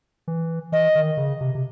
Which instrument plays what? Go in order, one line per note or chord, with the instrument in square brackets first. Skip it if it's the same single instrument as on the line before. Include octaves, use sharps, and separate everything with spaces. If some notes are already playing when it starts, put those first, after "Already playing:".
[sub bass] E3
[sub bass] E3 [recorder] D#5
[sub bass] D#3
C#3
C3
C3